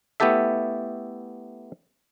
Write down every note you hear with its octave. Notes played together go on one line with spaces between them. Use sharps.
A3 B3 E4 G4 A4 E5